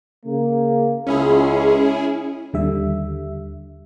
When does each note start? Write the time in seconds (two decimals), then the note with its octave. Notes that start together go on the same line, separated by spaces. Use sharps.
0.24 C#3 A#3
1.07 C#2 C#4 E4 G#4
2.53 D#2 D3 G3 E5